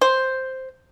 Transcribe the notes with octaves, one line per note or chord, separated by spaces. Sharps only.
C5